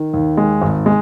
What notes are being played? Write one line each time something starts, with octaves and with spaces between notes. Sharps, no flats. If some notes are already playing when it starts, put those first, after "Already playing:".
Already playing: D#3
D#2
G#3
G#1
G#3